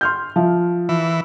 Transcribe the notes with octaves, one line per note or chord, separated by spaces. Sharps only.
C6 F6 G6
F3 E5
E3